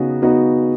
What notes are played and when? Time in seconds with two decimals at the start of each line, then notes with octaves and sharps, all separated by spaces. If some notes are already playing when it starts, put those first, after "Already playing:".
Already playing: C#3 B3 D#4 F#4
0.22 B3 D#4 F#4